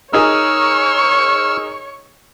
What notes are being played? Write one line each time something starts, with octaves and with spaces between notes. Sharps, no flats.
D#4 G#4 A#4 C#5 C#6 E6 F6